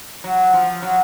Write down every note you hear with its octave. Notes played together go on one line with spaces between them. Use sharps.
F#3
F3
F#3